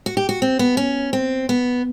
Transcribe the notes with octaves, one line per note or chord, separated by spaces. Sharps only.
F#4
G4
F#4
C4
B3
C#4
C4
B3